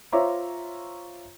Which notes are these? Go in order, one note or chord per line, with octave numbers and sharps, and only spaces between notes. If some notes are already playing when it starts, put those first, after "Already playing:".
F4 C5 C#5 E5 A#5 D6